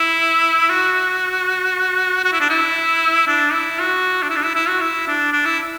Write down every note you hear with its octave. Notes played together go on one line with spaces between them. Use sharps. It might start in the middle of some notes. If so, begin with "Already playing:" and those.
Already playing: E4
F#4
F#4
E4
D4
E4
D4
E4
F#4
D4
E4
D4
E4
E4
F#4
E4
D4
D4
E4